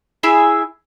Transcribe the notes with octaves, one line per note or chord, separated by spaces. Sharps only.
E4 G#4 E5 B5